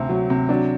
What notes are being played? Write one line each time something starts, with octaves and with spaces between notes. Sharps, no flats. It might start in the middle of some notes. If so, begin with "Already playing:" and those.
Already playing: D2 C3 C4
F#3
C3
F#3 D4